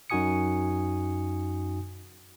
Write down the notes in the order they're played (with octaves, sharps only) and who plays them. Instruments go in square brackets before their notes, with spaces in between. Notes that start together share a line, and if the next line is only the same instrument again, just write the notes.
[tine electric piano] F#2 D#4 F#4 G#5 D#6 C#7